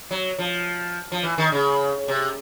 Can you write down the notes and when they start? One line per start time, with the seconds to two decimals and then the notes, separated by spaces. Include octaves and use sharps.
0.11 F#3
0.39 F3
1.12 F3
1.23 E3
1.38 D#3
1.52 C#3
2.08 C3